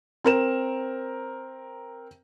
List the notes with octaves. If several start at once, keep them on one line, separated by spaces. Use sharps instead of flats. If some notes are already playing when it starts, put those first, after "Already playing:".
C4 A#4 E7